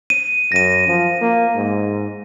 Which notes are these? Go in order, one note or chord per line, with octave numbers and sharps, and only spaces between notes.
D#7
F#2 A#6 D#7
F3
A#3
G#2